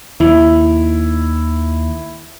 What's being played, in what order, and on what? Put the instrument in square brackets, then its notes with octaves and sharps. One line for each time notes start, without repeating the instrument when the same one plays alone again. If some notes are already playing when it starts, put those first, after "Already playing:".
[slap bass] D#2 D#3 [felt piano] E4